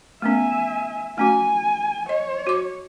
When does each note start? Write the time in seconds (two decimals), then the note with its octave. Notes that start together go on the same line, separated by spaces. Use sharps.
0.22 A3 B3 C#4 E5 G#5
1.18 A3 C#4 F#4 G#5
2.09 C#5 D#5
2.47 F#4 D6